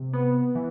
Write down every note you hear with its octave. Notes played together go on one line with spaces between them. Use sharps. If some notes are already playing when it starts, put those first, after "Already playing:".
Already playing: C3
B3
E3